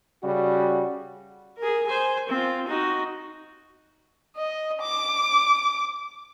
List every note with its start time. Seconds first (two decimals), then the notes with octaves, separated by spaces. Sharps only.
0.24 C#3 G3 F#4
1.58 G#4 A#4
1.87 C5 G#5
2.29 C4 F4
2.67 D#4 F#4
4.36 D#5
4.82 D6